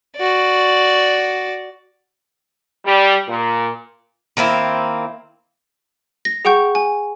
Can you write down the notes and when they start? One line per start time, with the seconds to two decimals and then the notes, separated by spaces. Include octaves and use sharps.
0.17 F#4 D5
2.86 G3
3.28 A#2
4.37 D#3 A#3 C4 E4
6.25 A#6
6.45 G#4 F#5 G5 C#6 G6
6.75 G#5